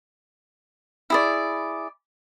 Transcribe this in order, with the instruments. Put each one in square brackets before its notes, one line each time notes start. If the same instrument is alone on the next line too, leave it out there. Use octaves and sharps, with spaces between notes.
[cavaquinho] E4 G#4 D5